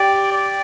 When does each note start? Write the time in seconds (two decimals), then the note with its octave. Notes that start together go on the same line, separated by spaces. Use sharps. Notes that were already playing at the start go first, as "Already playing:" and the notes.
Already playing: G4 D5
0.32 D5